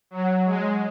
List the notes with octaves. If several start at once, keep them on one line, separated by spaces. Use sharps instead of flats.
F#3
G#3